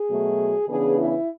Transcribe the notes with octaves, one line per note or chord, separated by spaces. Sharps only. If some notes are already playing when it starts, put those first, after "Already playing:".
Already playing: G#4
B2 F#3 A3
C#3 E3 B3 D4 G#4
E4